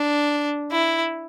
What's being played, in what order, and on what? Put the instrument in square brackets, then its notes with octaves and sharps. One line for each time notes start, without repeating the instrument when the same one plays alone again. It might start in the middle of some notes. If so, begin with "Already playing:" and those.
Already playing: [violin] D4
E4